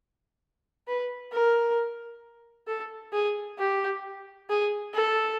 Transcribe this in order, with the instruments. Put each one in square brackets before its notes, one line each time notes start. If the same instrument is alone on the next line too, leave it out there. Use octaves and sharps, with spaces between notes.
[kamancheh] B4
A#4
A4
G#4
G4
G#4
A4